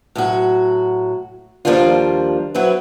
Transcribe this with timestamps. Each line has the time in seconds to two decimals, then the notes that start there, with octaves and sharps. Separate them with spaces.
0.15 A2 F#3 F#4
1.65 D#2 F3 G3 A#3 D4 F4
2.54 F#3 C4 E4 B4